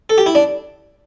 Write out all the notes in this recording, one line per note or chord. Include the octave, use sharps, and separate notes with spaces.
A4
G4
E4
D4